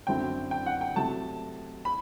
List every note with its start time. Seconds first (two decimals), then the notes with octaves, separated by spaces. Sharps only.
0.07 F#2 D3 F#3 C4 E4 G5
0.51 G5
0.66 F#5
0.81 G5
0.96 C3 F#3 A3 A5
1.85 B5